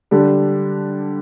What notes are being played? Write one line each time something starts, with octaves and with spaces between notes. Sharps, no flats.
D3 G3 D4